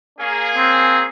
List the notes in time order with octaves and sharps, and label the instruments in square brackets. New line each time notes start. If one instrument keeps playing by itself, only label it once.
[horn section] A#3 C#4 G#4
[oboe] C4